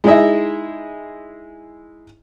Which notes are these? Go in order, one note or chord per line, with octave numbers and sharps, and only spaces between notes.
G#3 D#4 E4 G#4 D#5 E5